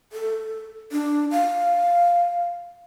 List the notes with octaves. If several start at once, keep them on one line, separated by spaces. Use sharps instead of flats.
A4
D4
F5